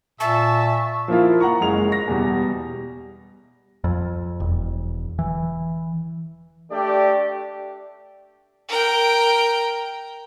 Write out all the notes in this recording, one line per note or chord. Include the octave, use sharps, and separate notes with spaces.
A#2 E5 A5 C#6
F3 A#3 E4 F4
F#5 A#5 C#6
F#1 G#3 F7
A#6
E2 B2 G3
F2
E1
E3
A3 D4 G4 D5
A#4 G5